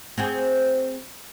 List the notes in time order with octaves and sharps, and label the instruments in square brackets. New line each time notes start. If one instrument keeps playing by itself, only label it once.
[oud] C4 F#4 G#4